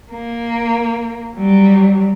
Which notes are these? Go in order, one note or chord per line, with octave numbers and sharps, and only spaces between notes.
A#3
F#3 G3